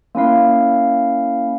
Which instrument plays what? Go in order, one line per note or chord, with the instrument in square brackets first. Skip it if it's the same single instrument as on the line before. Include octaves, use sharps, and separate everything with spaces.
[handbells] A#3 C#4 E4 F5